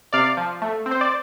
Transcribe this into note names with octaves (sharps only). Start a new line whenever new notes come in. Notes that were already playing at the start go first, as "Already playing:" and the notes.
C3 D5 F5
F3
A3
C4
C5
D5